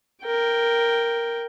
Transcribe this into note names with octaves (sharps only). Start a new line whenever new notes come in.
A#4 G5